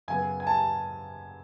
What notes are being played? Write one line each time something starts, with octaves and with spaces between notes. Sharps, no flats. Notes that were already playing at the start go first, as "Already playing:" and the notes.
F#2 C#3 F#3 B3 G#5
G#5
A5